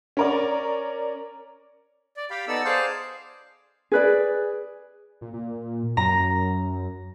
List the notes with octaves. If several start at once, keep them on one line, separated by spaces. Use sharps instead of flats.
C#4 A#4 D5
D5
G4 F5 G5 B5
B3 D#4 A4 D5 E6
G#4 C5 D5 F5 A5
G#4 B4 D5
A#2
A#2
F#2 A#5